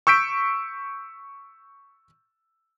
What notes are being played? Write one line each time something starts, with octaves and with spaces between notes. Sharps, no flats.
C#6 E6 G6 B6 D7